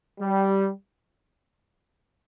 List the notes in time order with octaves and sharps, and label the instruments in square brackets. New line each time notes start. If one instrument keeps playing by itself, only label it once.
[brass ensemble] G3